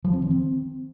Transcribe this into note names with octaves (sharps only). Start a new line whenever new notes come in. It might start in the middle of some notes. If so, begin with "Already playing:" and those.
F3
C4
D#3
C4